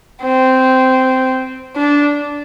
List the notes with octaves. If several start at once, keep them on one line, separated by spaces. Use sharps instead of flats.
C4
D4